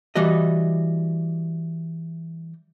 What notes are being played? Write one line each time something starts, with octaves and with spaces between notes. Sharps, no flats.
E3 G3 F#4 D#5